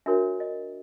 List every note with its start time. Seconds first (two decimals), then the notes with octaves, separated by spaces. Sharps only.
0.06 D4 F#4 A#4 C#5 E5
0.40 D#5